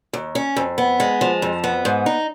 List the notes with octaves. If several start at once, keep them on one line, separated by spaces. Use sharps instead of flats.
D#2
C#4
F2
B3
G#3
F3
F2
B3
G#2
D#4